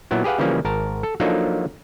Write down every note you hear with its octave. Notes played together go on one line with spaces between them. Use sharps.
A#2 F#3 B3 E4
G4 G#4 B4 F5 F#5
C#3 E3 F3 G3 A#3 C#4
G#1 A#4 A5
A4
F3 F#3 A#3 D4 D#4 A4